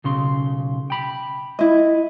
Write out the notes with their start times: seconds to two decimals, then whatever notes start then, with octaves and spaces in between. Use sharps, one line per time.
0.04 B1 C#3 C6
0.90 G5 B5
1.59 E4 D#5